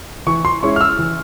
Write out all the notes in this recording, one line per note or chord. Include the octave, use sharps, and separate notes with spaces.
E3 C#6
C6
G#3 C#4 E4 C#6
F6
E6
E3